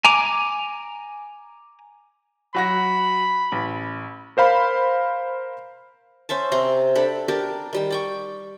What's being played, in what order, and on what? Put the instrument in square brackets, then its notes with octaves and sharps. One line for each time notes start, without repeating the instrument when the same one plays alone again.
[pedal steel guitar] G#5 A#5 D6
[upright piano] F#3 F#4 A#6 [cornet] B5
[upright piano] A1
[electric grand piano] A#4 C5 F5 B5
[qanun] C#4 C5 E5 A5
C3 G4 A#5 C6
D4 G4 A4 B5
D4 G4 A#4 A5
D#3 G3 A5
D5 G5 C#6